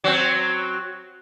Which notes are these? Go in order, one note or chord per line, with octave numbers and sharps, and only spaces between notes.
F#3 C4